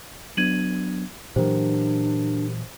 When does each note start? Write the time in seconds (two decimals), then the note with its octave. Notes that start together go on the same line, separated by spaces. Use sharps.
0.37 F#3 B3 D4 G#6 D#7 F#7
1.36 A#2 E3 F#3 D4 G4 A#4 C5